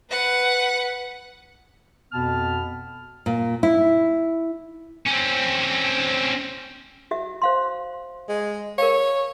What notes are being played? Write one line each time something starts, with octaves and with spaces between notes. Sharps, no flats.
B4 F#5
F2 B2 B3 A5 F6
A#2
E4
C4 C#4
F#4 E5
C5 F5 C6
G#3
A#4 C#5 F5